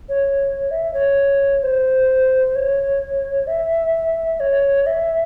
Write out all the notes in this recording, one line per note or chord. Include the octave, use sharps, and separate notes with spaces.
C#5
E5
C#5
C5
C#5
E5
C#5
E5